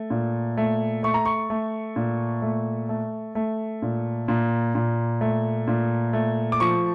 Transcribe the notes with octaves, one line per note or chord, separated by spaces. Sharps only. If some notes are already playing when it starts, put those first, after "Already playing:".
Already playing: A3
A#2
A3
A3 C#6
A#5
C#6
A3
A#2
A3
A3
A3
A#2
A#2
A#2
A3
A#2
A3
D6
F3 C#6